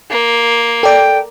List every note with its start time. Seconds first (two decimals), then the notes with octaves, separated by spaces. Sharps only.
0.11 A#3
0.83 A4 D5 G5